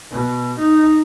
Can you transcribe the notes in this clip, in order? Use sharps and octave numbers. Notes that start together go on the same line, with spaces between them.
B2
D#4